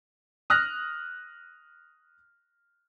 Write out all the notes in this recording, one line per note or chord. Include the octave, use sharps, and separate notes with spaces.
D#6 F6 F#6 A#6